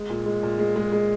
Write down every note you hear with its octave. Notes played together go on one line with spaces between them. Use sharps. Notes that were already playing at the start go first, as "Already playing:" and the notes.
Already playing: G#3
A#2
G#3
A#2
G#3
G#3
G#3